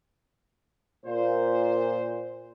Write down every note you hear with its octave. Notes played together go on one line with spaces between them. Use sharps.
A#2 C5